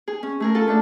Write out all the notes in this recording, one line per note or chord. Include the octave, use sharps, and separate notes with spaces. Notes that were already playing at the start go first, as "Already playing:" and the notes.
G#4
C#4
A3 G#4 A#4
F4 A4
A3 D4 A4